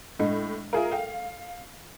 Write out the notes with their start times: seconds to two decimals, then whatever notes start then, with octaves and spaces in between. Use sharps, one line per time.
0.19 A2 G#3 D4 D#5
0.73 F4 G#4 A#4 E5 F5
0.91 A4 F5 G5